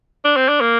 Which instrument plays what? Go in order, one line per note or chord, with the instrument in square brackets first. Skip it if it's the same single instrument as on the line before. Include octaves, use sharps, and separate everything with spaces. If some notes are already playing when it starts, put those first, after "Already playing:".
[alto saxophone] D4
C4
D4
A#3